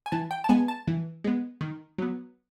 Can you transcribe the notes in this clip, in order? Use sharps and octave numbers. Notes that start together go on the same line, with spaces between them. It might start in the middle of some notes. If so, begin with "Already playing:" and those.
G#5
E3 A5
G5
A5
G#3 B3 G#5
A5
E3
G#3 B3
D#3
F#3 B3